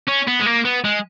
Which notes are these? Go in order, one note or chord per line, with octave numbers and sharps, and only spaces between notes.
C#4
B3
G#3
A#3
B3
G#3